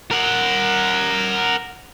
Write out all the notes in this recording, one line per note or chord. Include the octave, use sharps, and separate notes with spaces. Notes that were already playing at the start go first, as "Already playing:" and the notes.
A#4 F#5